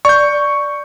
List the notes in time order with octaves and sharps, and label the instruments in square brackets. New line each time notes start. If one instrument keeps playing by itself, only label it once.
[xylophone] D5 [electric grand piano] C#6 G6